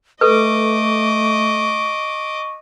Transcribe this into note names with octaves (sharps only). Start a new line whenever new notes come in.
A3 A4 B4 D#5 C#6 D6